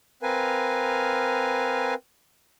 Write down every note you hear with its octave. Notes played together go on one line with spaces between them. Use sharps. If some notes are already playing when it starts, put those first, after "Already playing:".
C4 A#4 B4 F5 G#5